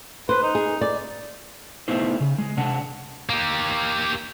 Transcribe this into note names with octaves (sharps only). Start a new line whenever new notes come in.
B4 C5
D#4
G#4
D5
A3 B3 D#4 E4 C5
C#3
G#3
C3 D4 F#5
A#3 G4